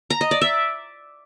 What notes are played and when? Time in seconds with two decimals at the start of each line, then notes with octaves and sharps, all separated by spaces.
0.10 A#5
0.21 D#5
0.31 D5
0.41 E5